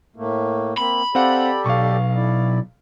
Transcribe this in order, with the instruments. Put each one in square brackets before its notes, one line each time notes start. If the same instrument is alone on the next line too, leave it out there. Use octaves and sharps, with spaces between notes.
[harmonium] A2 A3 A#3
[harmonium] A#3 C4 [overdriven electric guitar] B5
[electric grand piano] C4 F5 F#5 [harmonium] G4 A4 D5
[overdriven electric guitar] B1 [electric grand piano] F5 C#6
[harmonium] E4 D5